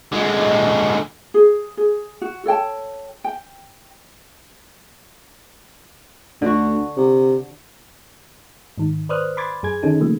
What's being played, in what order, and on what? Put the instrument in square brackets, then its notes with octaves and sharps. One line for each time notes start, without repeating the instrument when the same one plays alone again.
[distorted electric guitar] D3 G#3
[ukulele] G#4
G#4
F#4
A4 C#5 G5 A5
G5
[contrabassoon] D2 [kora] D3 F#4
[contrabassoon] C3
[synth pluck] G#2 D#3
B4 C5 D5 D#6 F6 F#6
B5 C6 D6 G#6 A6
F#2 G#4 G#6
D3 D#3 C#4 D#4 G#4 A4
C#3 F3 A3 A#3